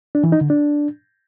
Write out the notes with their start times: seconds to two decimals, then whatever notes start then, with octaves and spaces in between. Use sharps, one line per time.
0.15 D4
0.24 E3
0.32 D#4
0.41 D3
0.50 D4